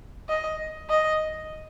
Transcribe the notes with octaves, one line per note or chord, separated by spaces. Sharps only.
D#5
D#5